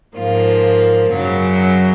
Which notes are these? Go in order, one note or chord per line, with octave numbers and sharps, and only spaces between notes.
G#2 F3 A#3 F4
F#2 C#3 F#3